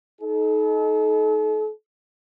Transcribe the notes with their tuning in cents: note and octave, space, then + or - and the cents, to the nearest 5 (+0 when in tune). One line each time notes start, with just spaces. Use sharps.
D#4 +15 A4 -40